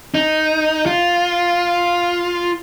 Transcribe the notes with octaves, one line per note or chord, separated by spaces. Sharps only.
D#4
F4